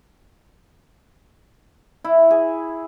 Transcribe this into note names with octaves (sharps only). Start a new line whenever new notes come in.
E4
G#4